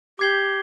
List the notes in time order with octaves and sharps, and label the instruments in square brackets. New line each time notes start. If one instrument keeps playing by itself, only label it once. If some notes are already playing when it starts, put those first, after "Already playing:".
[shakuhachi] G4 [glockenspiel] D6 G#6 C7 G7